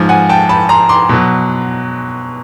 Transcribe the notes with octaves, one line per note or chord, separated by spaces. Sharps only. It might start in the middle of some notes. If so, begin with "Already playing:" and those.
Already playing: G#2 F3
F#5 G#5
G5 A5
A5 B5
A#5 C6
C6 D6
B2 F#3